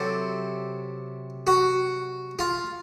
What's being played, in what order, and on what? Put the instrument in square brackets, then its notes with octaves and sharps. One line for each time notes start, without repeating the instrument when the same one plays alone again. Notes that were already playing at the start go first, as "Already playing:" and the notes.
Already playing: [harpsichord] C3 F#3 C4 A4
F#4
F4